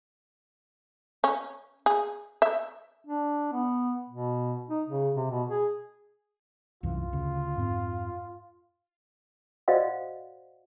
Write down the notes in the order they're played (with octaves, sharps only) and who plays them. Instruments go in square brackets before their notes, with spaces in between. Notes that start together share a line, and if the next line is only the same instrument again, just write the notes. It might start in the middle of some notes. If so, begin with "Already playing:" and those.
[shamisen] C#4
G#4
E5
[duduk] D4
B3
B2
D#4
C#3
C3
B2
G#4
[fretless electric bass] C2 F#2 E3 [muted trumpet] F4
[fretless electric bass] D2 C#3
F2 G#2 C4
[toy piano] F#4 C5 D5 D#5 F5 F#5